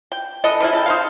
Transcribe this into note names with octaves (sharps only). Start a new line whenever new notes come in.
G5
E3 D4 A4 D#5
E3 F3 D#4 E4
C#3 A4 G5
D#4 C5 F5